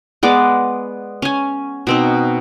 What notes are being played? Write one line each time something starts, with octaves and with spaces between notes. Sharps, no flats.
G#3 B3 D5 D6
C#4 G#5
B2 C4 D#4